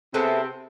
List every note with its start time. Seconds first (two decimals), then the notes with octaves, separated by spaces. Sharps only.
0.14 C3 G#3 B3 C4 E4 A4